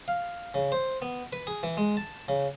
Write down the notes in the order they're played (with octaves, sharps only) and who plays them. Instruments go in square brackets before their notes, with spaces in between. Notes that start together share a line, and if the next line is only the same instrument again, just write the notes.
[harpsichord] F5
C#3
C5
B3
B4
G#4
E3
G#3
A5
C#3